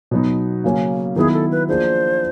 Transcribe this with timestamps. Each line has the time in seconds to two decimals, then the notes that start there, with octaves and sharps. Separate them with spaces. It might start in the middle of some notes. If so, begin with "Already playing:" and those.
0.11 B2 F#3 B3 D#4
0.64 C#3 F#3 A#3 C#4
1.16 D#3 F#3 B3 E4 G#4
1.34 A4
1.51 B4
1.68 F3 A#3 D4 F4 G#4 C5